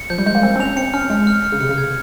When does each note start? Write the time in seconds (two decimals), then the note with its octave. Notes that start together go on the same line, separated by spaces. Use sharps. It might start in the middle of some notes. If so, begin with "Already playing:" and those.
Already playing: C#7
0.10 F3 G6
0.18 G3
0.26 G#3 G6
0.35 A#3
0.43 C4 G6
0.56 C4
0.60 C#4 F7
0.76 C4 C#7
0.94 C#4 F6
1.10 G#3 C#7
1.27 F6
1.44 C#7
1.52 C#3
1.60 C3 C#7
1.69 C#3
1.78 G#6